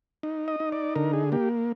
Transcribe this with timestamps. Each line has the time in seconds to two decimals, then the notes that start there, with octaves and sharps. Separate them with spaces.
0.23 D#4
0.48 D#5
0.60 D#4
0.72 D5
0.95 D3 A#4
1.13 G#4
1.32 A#3 G4